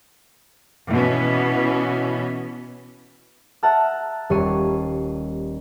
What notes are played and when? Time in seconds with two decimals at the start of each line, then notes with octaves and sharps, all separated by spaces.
0.90 B2 E3 B3 C#4
3.63 E5 F#5 A5 A#5 F6
4.30 D#1 G3 C#5 C7 D#7